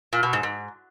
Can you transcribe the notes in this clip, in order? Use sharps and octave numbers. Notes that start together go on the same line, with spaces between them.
A#2
B2
G#2
G#2